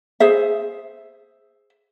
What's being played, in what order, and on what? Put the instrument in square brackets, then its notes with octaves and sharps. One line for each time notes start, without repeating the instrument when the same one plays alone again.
[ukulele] G#4 C5 E5